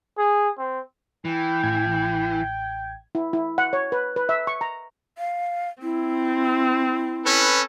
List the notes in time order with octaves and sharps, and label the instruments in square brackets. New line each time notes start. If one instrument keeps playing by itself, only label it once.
[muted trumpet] G#4
C4
[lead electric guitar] E3 [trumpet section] G5
[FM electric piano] A1 G#6
[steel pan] E4
E4
F#5
C#5
B4
B4
E5
C#6
A#5
[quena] F5
[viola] C4 [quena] E4
[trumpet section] C#4 A4 B4